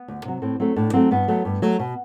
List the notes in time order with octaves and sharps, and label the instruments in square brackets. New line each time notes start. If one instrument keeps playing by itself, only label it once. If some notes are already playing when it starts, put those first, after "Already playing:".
Already playing: [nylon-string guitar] B3
D2
C3 F#3
A2 C4
F#3 A3 C4
A2 D4
F#3 A3 C4
G2 B3
F#3 A3
G2
F#3 A3
B2